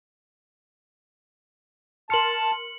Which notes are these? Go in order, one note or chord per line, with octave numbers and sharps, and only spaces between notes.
A#4 A5 C6 F6 C#7 F#7